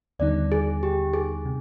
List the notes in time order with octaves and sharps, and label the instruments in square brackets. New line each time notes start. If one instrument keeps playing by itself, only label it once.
[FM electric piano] D#2 D3 G3 B3 D#4 [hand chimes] D5
[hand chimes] G#4
G4
G#4
[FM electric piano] C3